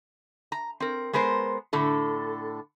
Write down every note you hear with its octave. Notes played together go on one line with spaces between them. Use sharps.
A#5
C4 A#4
G#3 B3 A#4 C5
A2 D3 A4